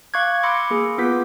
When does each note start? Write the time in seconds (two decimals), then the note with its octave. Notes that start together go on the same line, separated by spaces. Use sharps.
0.14 F5 C#6 D6 F#6 G#6
0.43 B5 C6 D6 E6 A#6 C#7
0.71 A#3 G#4 C6
0.98 B3 F4 B4 D6 G6 B6